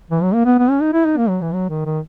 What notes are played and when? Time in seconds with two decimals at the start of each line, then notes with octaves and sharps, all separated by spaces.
0.11 E3
0.23 F#3
0.34 A#3
0.46 B3
0.59 B3
0.71 C#4
0.82 D#4
0.93 E4
1.05 D#4
1.17 A#3
1.29 F#3
1.42 E3
1.54 F#3
1.69 D#3
1.86 D#3